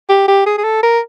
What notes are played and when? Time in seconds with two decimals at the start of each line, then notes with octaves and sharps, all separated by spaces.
0.09 G4
0.28 G4
0.46 G#4
0.58 G#4
0.64 A4
0.83 A#4